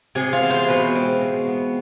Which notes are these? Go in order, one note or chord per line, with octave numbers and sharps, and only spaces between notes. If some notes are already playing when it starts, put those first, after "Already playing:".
C3 G#4
F4
E3 B3
C5
B2 B4
G#3 C4
B2
B3